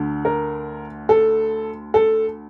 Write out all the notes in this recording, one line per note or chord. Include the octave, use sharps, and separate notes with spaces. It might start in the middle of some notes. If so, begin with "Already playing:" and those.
Already playing: D2 D3
A#4
A4
A4